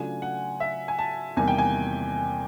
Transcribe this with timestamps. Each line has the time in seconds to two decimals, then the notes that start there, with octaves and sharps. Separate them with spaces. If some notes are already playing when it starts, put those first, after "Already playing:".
Already playing: C#3 F#3 A3 D4 F4 G#5
0.22 F#5
0.60 E5
0.88 G#5
0.99 A5
1.37 E2 C3 D#3 G3 A#3 G#5
1.48 G5
1.58 G#5